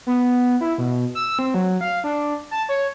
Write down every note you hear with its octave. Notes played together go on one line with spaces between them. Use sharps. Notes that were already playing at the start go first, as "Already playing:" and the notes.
B3
E4
B2
E6
C4
F#3
F5
D4
A5
C#5